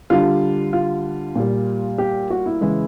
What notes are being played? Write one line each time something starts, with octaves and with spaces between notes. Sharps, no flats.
D3 G3 F4
F4
A#2 G3
G4
F#4
E4
C#3 E3 G#3 E4